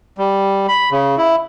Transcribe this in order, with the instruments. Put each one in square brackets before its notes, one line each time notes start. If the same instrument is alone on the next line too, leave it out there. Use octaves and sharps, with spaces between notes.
[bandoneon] G3
B5
C#3
E4